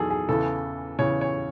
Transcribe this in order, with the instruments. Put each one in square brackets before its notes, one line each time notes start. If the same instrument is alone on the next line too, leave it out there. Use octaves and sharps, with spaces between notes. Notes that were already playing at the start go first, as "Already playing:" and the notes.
Already playing: [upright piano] E2 D#3 F#3 G#4 A4
G#4
E2 C#3 E3 A4
E2 C#3 E3 C#5
C#5